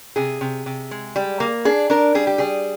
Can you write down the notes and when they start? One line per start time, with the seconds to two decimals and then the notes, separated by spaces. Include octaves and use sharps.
0.16 C3 G#4
0.41 C3
0.66 C3
0.91 G#3
1.16 G3
1.40 A#3
1.65 D4 G#4
1.90 D4 A#4
2.15 G3 G#4
2.27 G4
2.38 G3 G#4